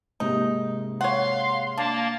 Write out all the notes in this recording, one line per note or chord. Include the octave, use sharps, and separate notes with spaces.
G#2 C3 A#3 D#4
C#5 F5 F#5 C6
A#3 D4 A5